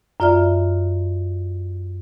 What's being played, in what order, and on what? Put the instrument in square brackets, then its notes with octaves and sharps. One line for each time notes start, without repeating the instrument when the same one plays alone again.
[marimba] F#2 F4 D5 E5 F6